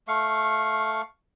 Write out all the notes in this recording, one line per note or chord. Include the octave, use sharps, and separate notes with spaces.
A3 F5 C#6